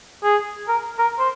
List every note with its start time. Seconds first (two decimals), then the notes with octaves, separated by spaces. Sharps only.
0.24 G#4
0.68 A#4
0.99 A#4
1.19 C5